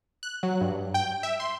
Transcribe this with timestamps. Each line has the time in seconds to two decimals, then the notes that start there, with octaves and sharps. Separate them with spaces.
0.23 F#6
0.43 F#3
0.61 G2
0.94 G5
1.23 E5
1.40 C6